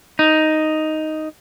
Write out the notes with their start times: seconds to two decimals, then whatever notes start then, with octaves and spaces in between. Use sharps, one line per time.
0.19 D#4